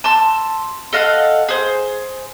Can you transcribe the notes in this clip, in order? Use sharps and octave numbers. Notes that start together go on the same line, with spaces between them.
A5 C6 E6
A4 D#5 F5 F#5
G#4 C5